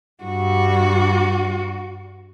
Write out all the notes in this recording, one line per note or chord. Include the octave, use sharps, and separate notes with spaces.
G2 F#4